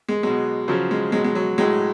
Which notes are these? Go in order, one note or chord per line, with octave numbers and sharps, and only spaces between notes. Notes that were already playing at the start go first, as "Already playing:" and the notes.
G#3
B2 F#3 G#3
C#3 F3 F#3
G#3
B2 F#3 G#3
G#3
F#3
A2 F#3 G#3